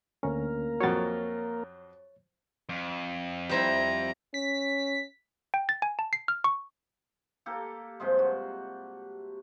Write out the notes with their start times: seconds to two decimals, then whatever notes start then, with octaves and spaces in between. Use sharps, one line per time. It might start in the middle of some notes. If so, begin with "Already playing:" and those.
0.23 D2 A#3 C#4 A#4
0.81 F2 F#3 C#5 A6
2.69 F2
3.49 G3 C4 E4 A#5
4.34 C#4 B6
5.54 G5
5.69 A6
5.82 G#5
5.99 A5
6.13 C7
6.28 F6
6.44 C#6
7.46 A#3 G4 A4
8.00 G2 C3 F3 G#3
8.19 F#4